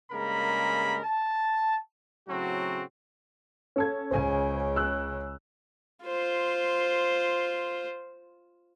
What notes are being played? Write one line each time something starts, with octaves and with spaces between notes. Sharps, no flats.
G2 C#3 G#3 A#3 A#4 B5
A5
A2 C#3 F#3 C4 F#4
C#4 A4 G#6
C#2 C#3 C5 G#5
E6 F#6
F4 C5